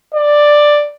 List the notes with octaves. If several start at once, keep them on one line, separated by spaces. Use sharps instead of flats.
D5